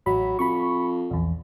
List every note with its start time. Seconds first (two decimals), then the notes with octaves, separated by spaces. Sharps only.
0.06 A1 F#3 B5
0.39 F2 B5 C#6
1.11 A#1 E2